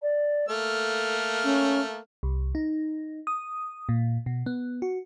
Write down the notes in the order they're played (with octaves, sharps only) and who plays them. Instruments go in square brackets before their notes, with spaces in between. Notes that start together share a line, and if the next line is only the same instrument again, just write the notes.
[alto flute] D5
[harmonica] A3 A#3 F6 [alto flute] A4
[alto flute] C#4
[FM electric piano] C2
D#4
D#6
A#2
B2
B3
F#4